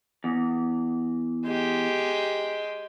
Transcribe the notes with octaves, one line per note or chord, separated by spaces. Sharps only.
E2
G#3 G4